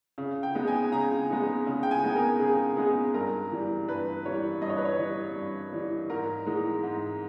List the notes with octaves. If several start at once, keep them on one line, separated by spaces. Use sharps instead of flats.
C#3
G5
G#3 B3 D#4
G#5
C#3 A#5
G#3 B3 D#4
C#3
G5
G#5
G#3 B3 D#4
A#4
C#3 G#4
G#3 B3 D#4 G#4
G2 A#4
E3 G3
G2 B4
E3 G3 C#5
G2 D#5
C#5
B4
C#5
E3 G3
G2
E3 G3
G#2 A#4
E3 G#3 D#4
G#2